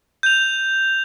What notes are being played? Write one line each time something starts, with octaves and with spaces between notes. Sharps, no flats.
G6 F7